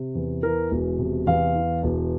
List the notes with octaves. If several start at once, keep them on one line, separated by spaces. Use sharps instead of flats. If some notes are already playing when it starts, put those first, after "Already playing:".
Already playing: C3
E2
E3 A#4
E1
C3
E2 F5
E3
E1